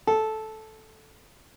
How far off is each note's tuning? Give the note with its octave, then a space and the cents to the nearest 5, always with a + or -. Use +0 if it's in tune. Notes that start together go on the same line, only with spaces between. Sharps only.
A4 -10